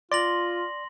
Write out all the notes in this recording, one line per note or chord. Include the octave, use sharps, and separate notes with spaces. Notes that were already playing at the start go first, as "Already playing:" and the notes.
F4 D5 C6 A#6 F#7